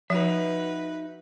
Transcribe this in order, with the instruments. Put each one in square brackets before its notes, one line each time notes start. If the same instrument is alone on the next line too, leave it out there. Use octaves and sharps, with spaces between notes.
[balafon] F3 [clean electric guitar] D#4 F#4 E5 [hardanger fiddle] B4